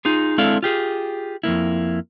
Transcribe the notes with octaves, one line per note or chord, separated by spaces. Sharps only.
D#4 F4 G#4
G#3 C4 D4 E4 A4 F5
F4 G4 G#4
F2 G#2 A#3 E4